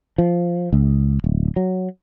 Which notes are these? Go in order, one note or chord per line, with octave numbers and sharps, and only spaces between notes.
F3
C#2
D1
F#3